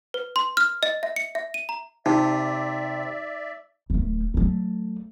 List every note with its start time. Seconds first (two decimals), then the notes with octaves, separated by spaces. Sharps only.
0.14 B4
0.36 C6
0.57 F6
0.83 D#5
1.03 E5
1.16 C#7
1.35 E5
1.54 D#7
1.69 A#5
2.06 C3 D#4 D5 E5
3.90 D1 A3
4.34 F#3 A3